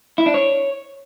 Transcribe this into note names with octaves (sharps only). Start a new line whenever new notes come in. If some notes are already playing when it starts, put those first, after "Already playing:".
E4
D4
C#5